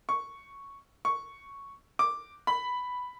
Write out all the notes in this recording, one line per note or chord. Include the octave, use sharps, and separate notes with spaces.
C#6
C#6
D6
B5